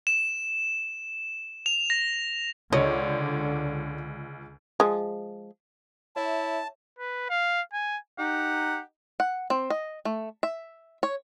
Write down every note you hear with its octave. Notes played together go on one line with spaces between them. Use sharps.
E7
F7
A#6
C#2 D3 C#5 D#5
F3 G#3
E4 C#5 E5 A5
B4
F5
G#5
D#4 G4 F#5
F#5
C4
D#5
A3
E5
C#5